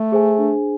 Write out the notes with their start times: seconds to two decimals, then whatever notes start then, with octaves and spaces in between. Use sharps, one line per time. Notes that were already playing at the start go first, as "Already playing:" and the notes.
Already playing: A3
0.12 G#4 C5 G#5
0.38 D4